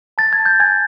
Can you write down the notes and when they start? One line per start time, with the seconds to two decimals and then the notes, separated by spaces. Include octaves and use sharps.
0.18 A5 A6
0.33 G#6
0.40 A5
0.46 G6
0.60 G#5 G#6